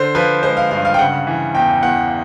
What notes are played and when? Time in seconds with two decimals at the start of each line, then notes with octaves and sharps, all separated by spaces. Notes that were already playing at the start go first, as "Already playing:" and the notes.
Already playing: D3 C5
0.15 F3 B4
0.43 G#3 C5
0.57 F5
0.71 G2 F5
0.85 F5
0.94 G5
0.99 C#3 F#5
1.27 E3
1.55 E2 G5
1.82 E2 F#5